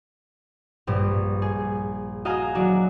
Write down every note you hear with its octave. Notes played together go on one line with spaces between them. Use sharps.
A#1 G2
G#4
F#4 D#5 F5 G#5 A#5
F#3 D4 F#4